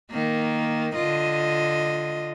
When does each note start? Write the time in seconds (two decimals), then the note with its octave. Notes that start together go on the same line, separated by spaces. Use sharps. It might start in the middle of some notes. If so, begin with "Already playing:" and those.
0.11 D#3 A#3
0.95 D3 F4 D#5